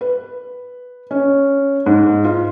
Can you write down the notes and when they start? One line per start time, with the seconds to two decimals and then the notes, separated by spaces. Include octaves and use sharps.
0.01 B4
1.11 C#4
1.86 G#2
2.25 F4